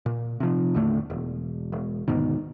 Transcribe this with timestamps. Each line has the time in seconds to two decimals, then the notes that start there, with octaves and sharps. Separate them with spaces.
0.06 A#2
0.40 C3 F3
0.74 D#2 A2 D3 A3
1.10 E1
1.72 E1
2.08 D2 G#2 B2 D#3